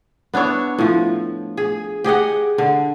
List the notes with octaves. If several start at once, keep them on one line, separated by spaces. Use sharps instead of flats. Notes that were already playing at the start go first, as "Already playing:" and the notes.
B3 D4 E4 C#5
A2 F3
G#4
G4 G#4 D#5 F#5
D3